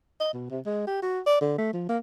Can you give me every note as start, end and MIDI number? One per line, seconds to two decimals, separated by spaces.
0.20 0.31 75
0.34 0.49 47
0.50 0.60 48
0.66 0.83 56
0.87 1.02 67
1.02 1.20 66
1.26 1.38 74
1.41 1.55 50
1.58 1.71 57
1.73 1.88 53
1.89 1.98 58